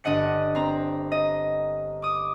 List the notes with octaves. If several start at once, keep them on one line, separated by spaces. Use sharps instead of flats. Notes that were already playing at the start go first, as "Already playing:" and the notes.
G1 D4 D#5 F#5 C#7
C4 A#5
D#5
D6 D#6